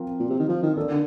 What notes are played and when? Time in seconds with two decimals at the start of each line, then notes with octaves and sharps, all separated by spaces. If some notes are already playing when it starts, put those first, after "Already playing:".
Already playing: F3 C4 F4 A#4
0.20 A#2
0.30 C3
0.39 D#3
0.49 F3
0.63 D#3
0.76 A#3 D4 A4
0.90 D3